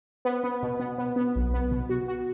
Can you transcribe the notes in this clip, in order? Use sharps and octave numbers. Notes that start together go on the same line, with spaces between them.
B3
B3
B2
B3
B3
B3
B1
B3
B2
F#4
F#4